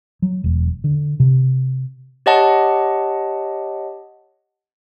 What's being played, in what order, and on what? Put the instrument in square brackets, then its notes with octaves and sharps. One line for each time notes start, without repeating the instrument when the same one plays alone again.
[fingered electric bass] F#3
E1
D3
C3
[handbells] G4 C#5 D#5 F#5 A5